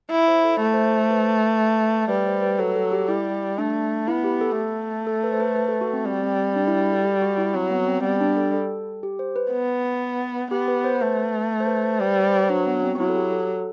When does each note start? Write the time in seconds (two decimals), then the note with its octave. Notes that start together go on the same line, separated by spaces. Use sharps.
0.11 E4
0.28 C5
0.44 A4
0.61 A3 A4
0.74 C5
0.86 C5
0.98 C5
1.11 B4
2.09 G3 B4
2.26 C5
2.42 B4
2.59 F#3 A4
2.76 A4
2.92 G4
3.08 G3 E4
3.58 A3 D4
4.08 B3 E4
4.24 G4
4.41 A4
4.57 A3
5.07 A4
5.23 B4
5.32 C5
5.40 B4
5.56 B4
5.69 A4
5.81 F#4
5.93 C4
6.06 G3 C4
6.23 C4
6.56 D4
6.68 E4
6.80 F#4
6.92 A4
7.05 G4
7.22 F#4
7.38 E4
7.54 F#3 C4
7.71 B3
7.87 C4
8.04 G3 B3
8.20 D4
8.37 A4
8.54 A4
9.03 G4
9.19 C5
9.36 B4
9.52 B3
10.51 B3 G4
10.68 B4
10.84 C5
11.01 A3 B4
11.60 C5
11.67 B4
11.84 C5
12.00 G3 B4
12.17 C5
12.28 C5
12.33 B4
12.49 F#3 D4
12.67 B3
12.83 C4
12.95 F#4
12.99 F#3 E4
13.09 A4
13.16 G4
13.32 A4
13.49 A4